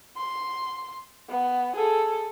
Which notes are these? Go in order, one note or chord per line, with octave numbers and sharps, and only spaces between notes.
C6
B3
G#4 A4